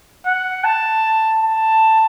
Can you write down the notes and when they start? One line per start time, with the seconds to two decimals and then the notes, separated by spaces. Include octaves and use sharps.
0.26 F#5
0.64 A5
1.43 A5